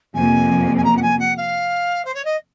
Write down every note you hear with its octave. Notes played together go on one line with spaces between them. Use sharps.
F2 C3 F3 A#3 G#5
G#5
A#5
F#5
G#5
F#5
F5
C5
C#5
D#5